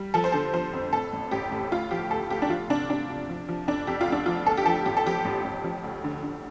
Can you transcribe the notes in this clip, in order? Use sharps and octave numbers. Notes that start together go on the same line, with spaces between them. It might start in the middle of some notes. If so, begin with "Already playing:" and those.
Already playing: G3
F3 A4
C5
D3 A4
F3 C5
F2
A2 A4
A1
A1 G4
A2
D2 F4
F3 G4
D2 A4
D2 G4
D4
F3 F4
C3 D4
C3 D4
C3
F3
F3
F2 D4
F2 G4
F4
D2 D4
F3 F4
D2 A4
G4
F3 A4
A1 G4
A4
F3 G4
A1
A1
F3
D2
D3
D3